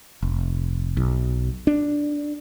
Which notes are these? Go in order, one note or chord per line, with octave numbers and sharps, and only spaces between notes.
F1
B1
D4